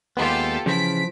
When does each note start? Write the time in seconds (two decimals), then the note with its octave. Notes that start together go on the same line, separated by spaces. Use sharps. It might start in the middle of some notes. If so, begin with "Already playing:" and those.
0.17 D#2 G#3 B3 F4 G4 A4
0.66 C#3 E3 F3 B6 D7